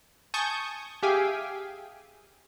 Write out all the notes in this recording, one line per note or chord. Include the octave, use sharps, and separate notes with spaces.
G#5 A5 C#6 D#6 G6
G4 G#4 E5 F5 G5 G#5